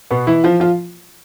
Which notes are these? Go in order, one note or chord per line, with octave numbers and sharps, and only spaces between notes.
B2 B3
E3 E4
F3 F4
F3 F4